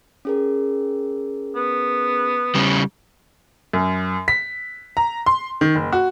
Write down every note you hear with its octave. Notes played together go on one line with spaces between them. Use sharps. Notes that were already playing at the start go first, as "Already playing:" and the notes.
C#4 G#4 A#4
B3
C#3 G3
F#2
B6
A#5
C6
D#3
F#1
F#4